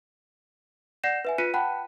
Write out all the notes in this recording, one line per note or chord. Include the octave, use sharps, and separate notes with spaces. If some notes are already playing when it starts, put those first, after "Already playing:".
D5 F#5 G6 A#6 C7 E7
B4 E5 G#5
F4 B4 F#6 B6 C#7 D#7
F#5 G5 A5 B5 F#6